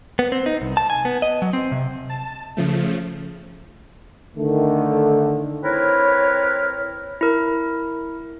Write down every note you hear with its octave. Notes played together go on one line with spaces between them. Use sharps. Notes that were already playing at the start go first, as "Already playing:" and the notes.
B3
C4
D#4
C2
A5
G#5
B3
D#5
F#3
C4
C3
A5
C#3 F3 A3
D3 D#3 A3
C4 E4 A#4 B4 C#5
E4 A#4